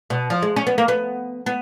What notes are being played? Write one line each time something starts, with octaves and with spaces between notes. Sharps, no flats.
B2
F3
G#3
C#4
B3
A#3
B3
B3